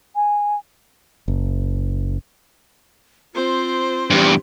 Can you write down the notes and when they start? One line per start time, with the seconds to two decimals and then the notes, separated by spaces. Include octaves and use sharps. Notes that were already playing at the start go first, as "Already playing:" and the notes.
0.16 G#5
1.28 F#1
3.35 C4 F4 C5
4.10 E2 G2 G4